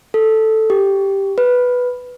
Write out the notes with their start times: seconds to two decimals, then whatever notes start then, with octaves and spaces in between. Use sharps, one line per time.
0.14 A4
0.70 G4
1.38 B4